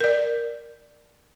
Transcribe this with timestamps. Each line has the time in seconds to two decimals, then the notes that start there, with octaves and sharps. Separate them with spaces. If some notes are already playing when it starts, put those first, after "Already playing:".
0.01 A#4 D5